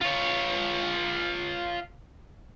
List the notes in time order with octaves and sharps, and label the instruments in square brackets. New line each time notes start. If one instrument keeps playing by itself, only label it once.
[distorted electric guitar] F4 C#5